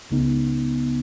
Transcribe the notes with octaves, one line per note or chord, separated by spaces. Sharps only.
C#2 C#3 G#3 B3 D#4